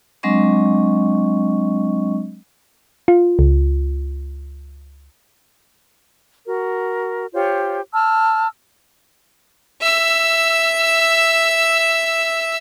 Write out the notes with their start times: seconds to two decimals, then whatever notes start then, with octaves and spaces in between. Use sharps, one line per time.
0.23 F#3 G#3 C4 D4 D#5 C#6
3.08 F4
3.39 C#2
6.46 F#4 A#4
7.33 F4 G4 C5 C#5
7.93 A5 E6 F6
9.81 E5 E6